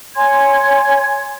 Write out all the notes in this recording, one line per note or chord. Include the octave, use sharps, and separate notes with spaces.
C#5 G#5 C6 G#6